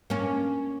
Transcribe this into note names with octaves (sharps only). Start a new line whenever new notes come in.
A#3 C#4